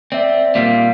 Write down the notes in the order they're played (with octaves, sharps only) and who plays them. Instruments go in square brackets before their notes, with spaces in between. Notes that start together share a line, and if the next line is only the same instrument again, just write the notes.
[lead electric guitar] C4 [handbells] D5 E5
[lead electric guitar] A#2 G3 [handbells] F5 B6